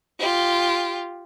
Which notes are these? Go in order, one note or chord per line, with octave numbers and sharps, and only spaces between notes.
F4 G4